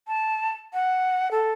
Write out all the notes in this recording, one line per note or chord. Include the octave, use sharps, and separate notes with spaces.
A5
F#5
A4